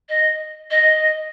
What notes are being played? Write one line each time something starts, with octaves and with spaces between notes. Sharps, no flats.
D#5
D#5